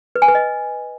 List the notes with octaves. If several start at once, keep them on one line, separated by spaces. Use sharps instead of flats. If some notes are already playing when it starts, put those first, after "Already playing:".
B4
G#5
B4
D#5